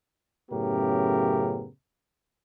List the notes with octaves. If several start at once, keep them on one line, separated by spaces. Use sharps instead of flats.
F#2 A2 C#3 B3 G4 A#4